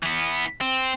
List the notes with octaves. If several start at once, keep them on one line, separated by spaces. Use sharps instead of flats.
E3 B3
C4